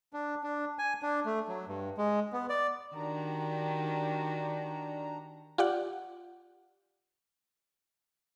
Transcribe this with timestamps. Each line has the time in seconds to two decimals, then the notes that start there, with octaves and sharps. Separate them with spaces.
0.13 D4
0.44 D4
0.79 G#5
1.02 D4
1.25 A3
1.48 F#3
1.68 G2
1.98 G#3
2.33 B3
2.50 D5
2.95 D#3 D4 F#4 G4 A#5
5.58 F4 G4 D5 F#5